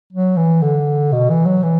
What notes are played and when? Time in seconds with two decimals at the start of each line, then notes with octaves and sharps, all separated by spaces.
0.13 F#3
0.37 E3
0.62 D3
1.12 B2
1.30 E3
1.45 F#3
1.63 E3